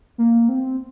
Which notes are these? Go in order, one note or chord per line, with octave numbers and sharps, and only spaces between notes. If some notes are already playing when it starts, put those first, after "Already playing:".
A#3
C4